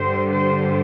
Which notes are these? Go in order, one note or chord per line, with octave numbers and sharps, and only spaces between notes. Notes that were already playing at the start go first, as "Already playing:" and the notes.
Already playing: G2 D3 G3 C5
C5